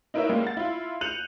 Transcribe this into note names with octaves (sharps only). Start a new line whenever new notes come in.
D#4 E4 A#4 B4 C#5 E5
G3 G#3 A#3 C#4
F#5 A6
E4 F4
F#6 G6 C#7 D#7 F7 F#7